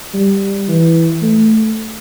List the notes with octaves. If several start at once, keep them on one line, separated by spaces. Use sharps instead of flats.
G3
E3
A3